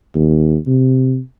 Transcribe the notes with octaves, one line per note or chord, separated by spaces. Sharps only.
D#2
C3